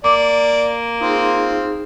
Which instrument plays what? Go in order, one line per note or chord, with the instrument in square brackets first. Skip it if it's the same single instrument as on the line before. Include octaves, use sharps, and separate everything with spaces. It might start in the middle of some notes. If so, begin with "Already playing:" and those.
[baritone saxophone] A#3 [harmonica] D5 [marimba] D6
[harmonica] C4 F4 [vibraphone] D#4 G#4